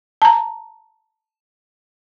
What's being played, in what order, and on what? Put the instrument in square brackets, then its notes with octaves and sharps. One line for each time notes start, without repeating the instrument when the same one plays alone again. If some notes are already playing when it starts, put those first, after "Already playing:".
[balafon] A5 A#5